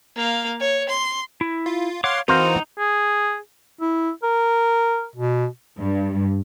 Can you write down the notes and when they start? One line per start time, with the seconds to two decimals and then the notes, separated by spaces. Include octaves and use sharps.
0.16 A#3 F5
0.60 C#5
0.89 C6
1.41 E4
1.66 F4
2.04 C#5 F5 F#5 C6 D6 F6
2.28 E3 C4 D#4 F#4 A#4 C5 F5
2.78 G#4
3.81 E4
4.23 A#4
5.16 B2
5.78 G2